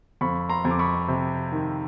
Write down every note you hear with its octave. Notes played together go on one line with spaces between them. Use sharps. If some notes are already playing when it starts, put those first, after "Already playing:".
F2 B5 C#6
A#5 C6
F2
D6
B5 C#6
C3
D#3